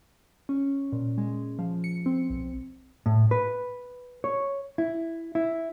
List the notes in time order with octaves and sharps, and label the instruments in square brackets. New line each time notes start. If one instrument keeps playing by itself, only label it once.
[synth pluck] C#4
A#2
G#3
F3
C#7
C4
B1
[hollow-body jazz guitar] A2
B4
C#5
E4
E4